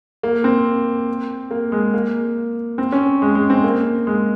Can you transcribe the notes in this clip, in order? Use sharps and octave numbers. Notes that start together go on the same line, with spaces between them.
A#3
C4
A#3
G#3
A#3
C4
C#4
G#3
G#3
C4
A#3
G#3